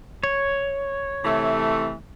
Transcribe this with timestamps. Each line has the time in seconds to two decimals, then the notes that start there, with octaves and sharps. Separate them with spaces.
0.23 C#5
1.25 C3 E3 A3